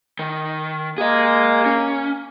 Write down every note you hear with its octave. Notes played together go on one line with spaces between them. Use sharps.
D#3
A#3 G#4 D#5
C#4